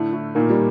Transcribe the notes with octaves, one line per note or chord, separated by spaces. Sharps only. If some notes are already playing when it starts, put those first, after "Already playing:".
Already playing: A2 D3 A3
A2
A#2 D#3 A#3
G3